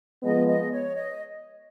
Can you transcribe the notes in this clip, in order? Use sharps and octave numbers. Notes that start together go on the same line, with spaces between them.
F3 G#3 B3 D#5
D#5
C#5
D#5